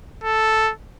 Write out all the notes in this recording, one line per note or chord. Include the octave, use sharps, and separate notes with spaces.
A4